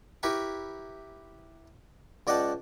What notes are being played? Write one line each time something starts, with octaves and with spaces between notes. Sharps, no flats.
E4 G4 A#4 B4 B5 C#6
C#2 D5 D#5 F#5 G5 A5